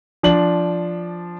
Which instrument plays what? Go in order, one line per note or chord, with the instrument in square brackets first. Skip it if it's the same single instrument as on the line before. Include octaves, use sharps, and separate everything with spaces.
[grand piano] F3 D4 F#7